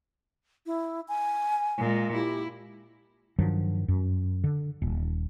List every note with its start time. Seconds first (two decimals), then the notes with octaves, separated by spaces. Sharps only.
0.66 E4
1.08 G#5
1.78 A#2 G#3
2.14 E4 G4
3.39 G2 D#3 F3 F#3
3.88 F#2
4.44 D3
4.82 D#1